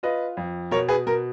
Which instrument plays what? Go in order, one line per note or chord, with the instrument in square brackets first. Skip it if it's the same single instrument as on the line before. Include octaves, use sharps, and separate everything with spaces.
[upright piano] F4 B4 D#5
F2
B2 A#4 C#5
G#4 B4
B2 A#4